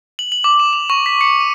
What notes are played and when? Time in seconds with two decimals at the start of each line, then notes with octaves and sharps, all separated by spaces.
0.19 F#7
0.32 F#7
0.44 D6
0.60 E7
0.73 F7
0.90 C#6
1.06 B6
1.21 C#7
1.40 D#7